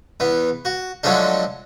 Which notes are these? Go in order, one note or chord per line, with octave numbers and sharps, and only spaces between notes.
E2 B3
F#4
D3 F3 F#3 G#3 A3 D4